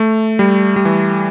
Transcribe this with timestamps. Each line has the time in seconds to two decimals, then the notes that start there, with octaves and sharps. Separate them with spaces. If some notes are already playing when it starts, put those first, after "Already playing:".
Already playing: A3
0.39 G3
0.76 G3
0.85 E3